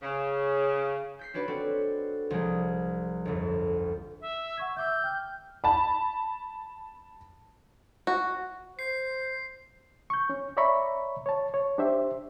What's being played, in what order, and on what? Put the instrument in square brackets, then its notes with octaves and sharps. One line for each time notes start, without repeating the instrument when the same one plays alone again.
[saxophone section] C#3
[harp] G6 B6 C7
C#4 D4 F#4 B4 D5
C4 F#4 A4
C2 F3 G#3
G1 F2
[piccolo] E5
[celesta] F#5 C#6 G#6
[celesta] E5 D6 E6 [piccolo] G6
[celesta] G5 F6
[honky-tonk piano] A5 B5
[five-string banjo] F#4
[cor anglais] C5 [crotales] C7
[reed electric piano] C#6 G6
C#4
C#5 D5 E5 A#5 B5 C#6
C#5 A5
C#5
D4 G4 C5 E5